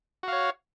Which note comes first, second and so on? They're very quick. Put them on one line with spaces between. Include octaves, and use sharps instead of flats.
F#4 F5 C#5